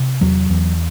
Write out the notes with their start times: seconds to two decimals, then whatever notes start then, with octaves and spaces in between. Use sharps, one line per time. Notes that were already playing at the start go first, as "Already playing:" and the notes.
Already playing: C3
0.21 E2 F#3
0.50 E2